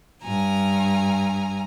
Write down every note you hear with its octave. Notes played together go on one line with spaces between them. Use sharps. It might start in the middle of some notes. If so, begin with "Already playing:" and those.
G2 G#5 A#5